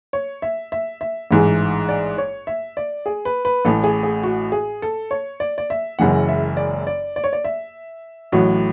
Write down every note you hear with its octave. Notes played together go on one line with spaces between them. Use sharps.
C#5
E5
E5
E5
A1 G#2 E3 G#3
D5
C#5
E5
D5
G#4
B4
B4
A1 A2 E3 A4
G#4
G#4
F#4
G#4
A4
C#5
D5
D5
E5
F#1 F#2 E3 G#3 F#5
E5
D5
D5
D5
C#5
D5
E5
A1 A2 F#3 F#4